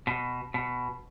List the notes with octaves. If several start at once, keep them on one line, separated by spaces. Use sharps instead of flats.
B2
B2